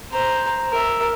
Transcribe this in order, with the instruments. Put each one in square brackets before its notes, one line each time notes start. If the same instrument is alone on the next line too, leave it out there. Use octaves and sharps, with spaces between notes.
[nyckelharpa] C5 A#5
A#4 E5